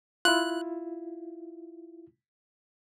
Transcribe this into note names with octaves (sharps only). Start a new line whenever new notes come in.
E4 F4 F#6